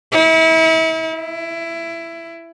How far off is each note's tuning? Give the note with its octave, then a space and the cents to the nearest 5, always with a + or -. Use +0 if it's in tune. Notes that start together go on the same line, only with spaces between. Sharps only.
E4 -35
E4 +20